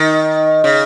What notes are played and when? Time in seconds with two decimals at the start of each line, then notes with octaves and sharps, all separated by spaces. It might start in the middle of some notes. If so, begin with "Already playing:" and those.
Already playing: D#3
0.64 C#3